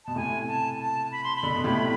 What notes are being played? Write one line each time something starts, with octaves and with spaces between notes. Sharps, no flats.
B2 A5
A2 C3 G#5
A5
A5
B5
C6
B5
B2 D3
B2
A2 C3